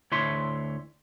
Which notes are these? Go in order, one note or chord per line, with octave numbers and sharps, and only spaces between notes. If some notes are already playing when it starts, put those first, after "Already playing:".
D2 E4 C#5 E5 C6